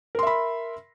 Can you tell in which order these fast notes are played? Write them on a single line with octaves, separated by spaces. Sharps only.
A#4 C6 E5 B5